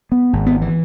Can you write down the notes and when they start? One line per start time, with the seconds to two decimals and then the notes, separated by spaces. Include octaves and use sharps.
0.12 B3
0.33 G#1 G#2
0.46 B3
0.61 E3